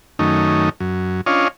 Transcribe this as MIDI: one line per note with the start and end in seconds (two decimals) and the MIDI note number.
0.19 0.69 42
0.19 0.69 51
0.19 0.69 57
0.19 0.69 61
0.19 0.69 63
0.80 1.21 42
1.26 1.48 61
1.26 1.48 62
1.26 1.48 65
1.26 1.48 73
1.26 1.48 75
1.26 1.48 77